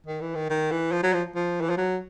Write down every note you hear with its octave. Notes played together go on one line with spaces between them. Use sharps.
D#3
E3
D#3
D#3
E3
F3
F#3
F3
F3
E3
F3
F#3